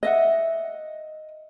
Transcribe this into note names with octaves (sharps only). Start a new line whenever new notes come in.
D#5 E5 F#5